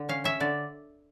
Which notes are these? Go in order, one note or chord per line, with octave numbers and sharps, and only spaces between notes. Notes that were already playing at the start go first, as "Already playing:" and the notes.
Already playing: D3
C#4 F5
C#4 E5
D3 D5